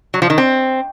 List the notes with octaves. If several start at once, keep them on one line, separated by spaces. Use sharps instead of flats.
F#3
F3
D#3
C4